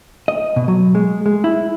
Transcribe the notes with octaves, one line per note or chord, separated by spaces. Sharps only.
D#5
B2
F#3
G#3
G#3
E4